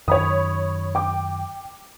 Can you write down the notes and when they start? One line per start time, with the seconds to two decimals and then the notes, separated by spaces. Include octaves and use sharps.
0.08 F#2 D#3 C#5 B5 D#6
0.95 G5 D6